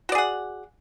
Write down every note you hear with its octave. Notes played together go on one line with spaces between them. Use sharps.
F#4 G#4 D5 F#5